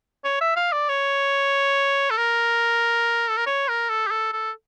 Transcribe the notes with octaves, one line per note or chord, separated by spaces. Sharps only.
C#5
E5
F5
D5
C#5
A4
A#4
A4
A#4
C#5
A#4
A4
G4
A4
A4